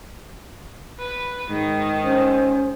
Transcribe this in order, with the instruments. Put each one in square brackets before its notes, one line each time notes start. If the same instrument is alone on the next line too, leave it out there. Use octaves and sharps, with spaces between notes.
[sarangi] B4
[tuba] G#2 [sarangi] D#3
[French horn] C#4 [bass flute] C5